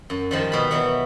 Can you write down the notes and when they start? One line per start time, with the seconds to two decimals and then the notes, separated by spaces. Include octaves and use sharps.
0.10 F#2
0.31 D#3 F3 G3
0.52 B2 B5
0.71 E3 F#3 B3